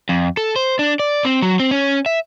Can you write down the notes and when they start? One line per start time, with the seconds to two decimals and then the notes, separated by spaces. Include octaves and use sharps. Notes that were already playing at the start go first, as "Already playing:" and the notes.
0.09 F2
0.37 A4
0.56 C5
0.79 D4
0.99 D5
1.25 C4
1.42 F#3
1.60 C4
1.71 C#4
2.06 E5